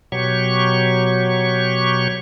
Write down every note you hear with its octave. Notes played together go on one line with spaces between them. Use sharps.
B2 F#3 G4 C#5 C#6